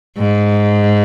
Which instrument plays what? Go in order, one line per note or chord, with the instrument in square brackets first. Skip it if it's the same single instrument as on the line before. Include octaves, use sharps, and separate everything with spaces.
[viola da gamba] G#2